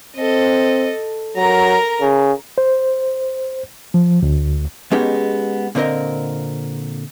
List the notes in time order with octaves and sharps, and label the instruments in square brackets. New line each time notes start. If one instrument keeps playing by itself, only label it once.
[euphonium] C4 [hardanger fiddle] A4 D#5
[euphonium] F#3 [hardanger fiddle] A#4 A#5
[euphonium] C#3
[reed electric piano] C5
F3
D2
[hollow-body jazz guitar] G#3 B3 C#4 D#4 G4 G#4
A#2 D3 C4 A#4 D#5